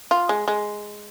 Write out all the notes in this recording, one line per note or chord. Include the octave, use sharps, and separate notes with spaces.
F4
G#3
G#3